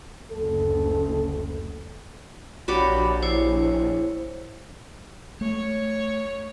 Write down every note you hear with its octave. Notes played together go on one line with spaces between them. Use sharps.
F#1 D2 A4
A#1 F#4 G4 C#5 D5 B5
E4 C5 C#5
A3 C#5